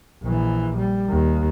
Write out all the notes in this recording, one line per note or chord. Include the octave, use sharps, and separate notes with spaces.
A#1 E3
G3
D#2